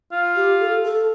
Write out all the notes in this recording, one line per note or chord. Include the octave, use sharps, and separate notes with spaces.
F4
G4
A4
A4